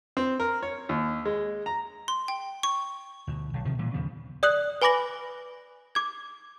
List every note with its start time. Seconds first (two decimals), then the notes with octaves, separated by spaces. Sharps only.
0.17 C4
0.40 A#4
0.63 C#5
0.89 D#2
1.25 G#3
1.66 A#5
2.08 C6
2.28 G5
2.63 C#6
3.27 D2 B2
3.53 B1 D3
3.65 C3 D#3 F3
3.79 A#2 E3 G3
3.94 D#2 C#3 F3 B3
4.43 D5 D#6 F#6 F#7
4.82 B4 G#5 B5 D6 A#6 F#7
5.95 D6 G#6